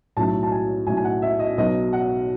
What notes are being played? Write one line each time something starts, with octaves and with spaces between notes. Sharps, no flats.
B1 A2 F#3 A5
A5
G#5
B1 A2 F#3 G#5
G#5
F#5
E5
D#5
B1 B2 F#3 D#5
F#5